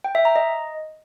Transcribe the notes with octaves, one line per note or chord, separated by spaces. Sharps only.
G5
E5
A#5
D#5